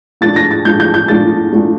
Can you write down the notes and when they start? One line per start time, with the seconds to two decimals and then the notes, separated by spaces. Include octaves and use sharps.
0.21 A#2 A3 D4 A6
0.36 A#6
0.51 A6
0.65 A#2 A3 D4 G6
0.80 G6
0.94 G6
1.08 A#2 A3 D4 A6
1.52 A#2 A3 D4